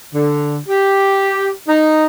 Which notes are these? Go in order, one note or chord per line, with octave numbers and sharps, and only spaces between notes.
D3
G4
D#4